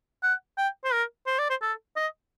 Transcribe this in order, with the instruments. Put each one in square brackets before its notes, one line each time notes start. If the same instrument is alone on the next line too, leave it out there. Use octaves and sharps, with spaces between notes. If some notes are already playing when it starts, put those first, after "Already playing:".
[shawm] F#5
G5
C5
A#4
C5
D5
C5
A4
D#5